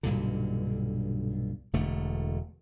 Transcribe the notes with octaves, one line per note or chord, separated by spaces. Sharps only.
B1 G2 A#2 D3
E1 D3 A3